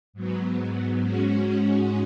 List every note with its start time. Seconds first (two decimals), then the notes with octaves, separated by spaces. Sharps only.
0.13 G#2 F#3 B3
0.97 G#2 G#3 C#4 F#4